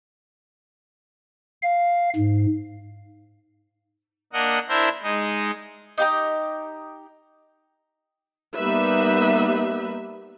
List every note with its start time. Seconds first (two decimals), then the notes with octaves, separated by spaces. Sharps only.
1.62 F5
2.16 G#2
4.33 A#3 D4 A#4 D#5 F#5
4.69 D4 E4 A#4 C5 E5
5.03 G#3 D#4
5.98 D#4 G4 G5 A#5
8.55 G3 A#3 B3 D#4 B4 E5